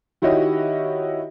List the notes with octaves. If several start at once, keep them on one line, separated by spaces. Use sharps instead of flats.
D#3 E4 F#4 G4 C#5 D#5